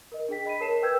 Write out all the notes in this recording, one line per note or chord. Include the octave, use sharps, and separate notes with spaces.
A#4 D#5
D4 G#4 G5 B6
D#5 B5 B6 D#7
A#4 C#5 A5 C7 E7
A#4 B4 G5 E6 G6 G#6